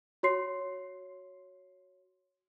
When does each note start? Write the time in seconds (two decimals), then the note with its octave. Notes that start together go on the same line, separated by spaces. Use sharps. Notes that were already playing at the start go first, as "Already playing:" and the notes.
0.23 F#4 C#5 C6 C7